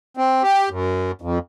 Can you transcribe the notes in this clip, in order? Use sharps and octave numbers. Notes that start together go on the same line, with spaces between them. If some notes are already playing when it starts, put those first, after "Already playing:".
C4
G4
F#2
F2